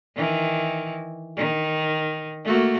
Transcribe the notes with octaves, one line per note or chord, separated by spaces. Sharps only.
D#3 E3
D#3
A3 A#3 F#4